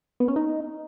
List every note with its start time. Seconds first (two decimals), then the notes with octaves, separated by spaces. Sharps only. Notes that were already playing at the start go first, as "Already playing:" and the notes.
0.20 B3
0.28 C#4
0.36 D#4